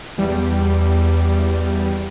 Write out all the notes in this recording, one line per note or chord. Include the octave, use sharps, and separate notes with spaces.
E2 G3